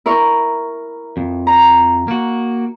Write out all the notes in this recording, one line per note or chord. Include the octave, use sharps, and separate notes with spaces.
E4 A#4 C#6
F2
A#5
A#3 F#4